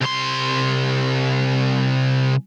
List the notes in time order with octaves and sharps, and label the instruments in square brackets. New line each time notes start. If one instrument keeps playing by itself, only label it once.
[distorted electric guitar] C2 C6